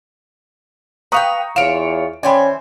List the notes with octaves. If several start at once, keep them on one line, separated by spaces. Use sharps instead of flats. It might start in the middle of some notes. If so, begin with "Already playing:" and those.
B4 F5 G5 A#5 C#6 D#6
E2 F4 C#5 D7 E7
E3 C#4 C5 D5 G5 G#5 B5